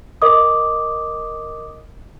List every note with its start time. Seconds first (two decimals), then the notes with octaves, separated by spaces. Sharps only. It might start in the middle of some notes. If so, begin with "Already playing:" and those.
0.22 A#4 D#5 D6 D#6